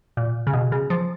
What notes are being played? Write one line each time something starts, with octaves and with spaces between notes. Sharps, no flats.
A#2
C#3
B2
C#3
F3